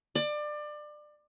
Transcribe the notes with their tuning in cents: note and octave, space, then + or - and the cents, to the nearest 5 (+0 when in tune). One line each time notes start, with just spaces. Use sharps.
D5 +25